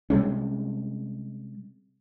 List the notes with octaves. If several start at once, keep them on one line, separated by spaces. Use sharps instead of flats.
C3 G3 G#3 C#4